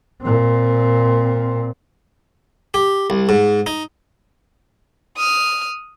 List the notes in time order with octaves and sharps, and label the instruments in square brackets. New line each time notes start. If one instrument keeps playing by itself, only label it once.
[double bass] A#2 C4
[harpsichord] G4
C2
G#2
D#4
[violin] D#6 F6